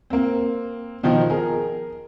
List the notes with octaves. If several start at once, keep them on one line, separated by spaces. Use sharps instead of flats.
A#3 C4
B2 D#3 F3 D#4
G#4 A#4